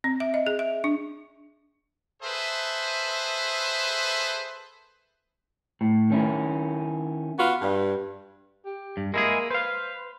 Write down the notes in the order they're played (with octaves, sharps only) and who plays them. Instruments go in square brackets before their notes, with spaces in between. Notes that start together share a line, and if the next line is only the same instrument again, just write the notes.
[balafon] C4
E5
D#5
G#4
E5
D4
[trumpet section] G#4 A4 B4 C5 E5
[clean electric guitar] A2
D#3 C#4 E4
[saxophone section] B3 F4 F#4
G2
[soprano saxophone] G4
[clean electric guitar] G2
[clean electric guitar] G#3 E4 G#4 [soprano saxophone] A#3
[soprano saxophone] B4 [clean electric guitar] C5 F5